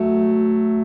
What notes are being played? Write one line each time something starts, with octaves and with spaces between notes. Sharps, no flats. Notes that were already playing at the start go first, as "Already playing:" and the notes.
Already playing: F#3 A3